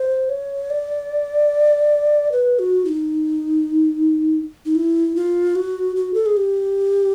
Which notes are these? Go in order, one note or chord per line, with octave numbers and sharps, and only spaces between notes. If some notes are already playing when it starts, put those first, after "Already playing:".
Already playing: C5
C#5
D5
B4
F#4
E4
D#4
D#4
E4
F4
F#4
F#4
A4
G#4
G4